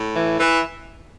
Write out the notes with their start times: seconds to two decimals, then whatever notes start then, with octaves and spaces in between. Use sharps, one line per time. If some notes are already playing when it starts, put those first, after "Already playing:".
Already playing: A2
0.16 E3
0.40 E3